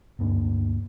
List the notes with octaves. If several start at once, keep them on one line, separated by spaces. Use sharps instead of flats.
D2 G2 A#3 D4